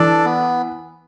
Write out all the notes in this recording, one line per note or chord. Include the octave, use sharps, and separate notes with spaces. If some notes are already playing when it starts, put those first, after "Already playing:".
Already playing: E3 D4 A4 D5
B3